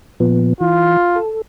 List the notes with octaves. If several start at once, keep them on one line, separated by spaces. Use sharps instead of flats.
A#2 F3 B3
E3 F4
A4